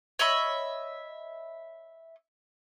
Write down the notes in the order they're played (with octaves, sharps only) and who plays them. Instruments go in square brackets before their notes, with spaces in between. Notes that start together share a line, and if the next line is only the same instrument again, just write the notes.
[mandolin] C#5 D#5 E5 B5